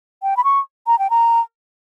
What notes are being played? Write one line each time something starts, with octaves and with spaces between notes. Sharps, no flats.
G5
B5
C#6
A#5
G5
A#5